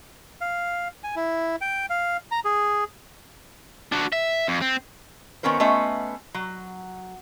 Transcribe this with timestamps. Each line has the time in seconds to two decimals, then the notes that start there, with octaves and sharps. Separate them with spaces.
0.41 F5
1.04 G#5
1.16 E4
1.61 G5
1.90 F5
2.31 A#5
2.45 G#4
3.92 D4 F#4
4.12 E5
4.48 F2
4.61 C4
5.43 D#3 B3 C#4 A#4 C5
5.60 A3 B3 C#4 F4 D#5 E5
6.34 F#3